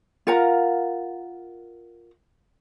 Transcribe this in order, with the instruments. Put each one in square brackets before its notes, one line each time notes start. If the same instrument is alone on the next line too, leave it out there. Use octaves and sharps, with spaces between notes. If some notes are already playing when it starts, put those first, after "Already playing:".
[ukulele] F4 A#4 F#5 A#5